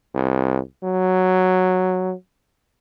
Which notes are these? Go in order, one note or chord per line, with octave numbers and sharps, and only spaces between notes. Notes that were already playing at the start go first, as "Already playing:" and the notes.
C2
F#3